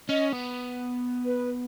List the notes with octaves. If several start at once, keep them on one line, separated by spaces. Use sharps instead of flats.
C#4 D#5
B3
B4